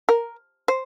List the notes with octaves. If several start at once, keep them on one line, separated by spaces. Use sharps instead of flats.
A#4
C5